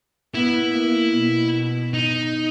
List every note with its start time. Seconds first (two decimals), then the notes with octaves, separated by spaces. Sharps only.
0.34 B3 E4
0.74 A#3
1.13 B2
1.94 D#4